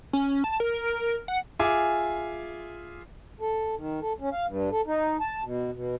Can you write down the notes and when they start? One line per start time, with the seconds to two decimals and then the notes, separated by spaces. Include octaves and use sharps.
0.13 C#4
0.44 A5
0.60 A#4
1.28 F#5
1.59 F4 G#4 E5 G#5 D6
3.40 A4
3.76 D#3
4.01 A4
4.20 C#4
4.32 F5
4.46 G2
4.71 A4
4.87 D#4
5.21 A5
5.44 B2
5.72 B2